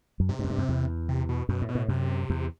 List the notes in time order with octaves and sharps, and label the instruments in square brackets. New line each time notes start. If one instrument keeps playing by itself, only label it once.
[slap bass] F#2
[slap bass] G2 [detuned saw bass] C3
[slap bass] G2
F#2
G2
F#2
E2
[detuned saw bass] C3
B2
[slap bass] F#2 [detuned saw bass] B2
[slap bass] A2
[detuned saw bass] B2
[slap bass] A2
[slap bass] F#2 [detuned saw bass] C3
[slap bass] E2